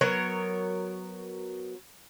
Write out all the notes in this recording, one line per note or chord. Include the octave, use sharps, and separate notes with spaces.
F#3 B3 A#4 C#5